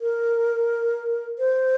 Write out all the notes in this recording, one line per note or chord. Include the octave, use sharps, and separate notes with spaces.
A#4
C5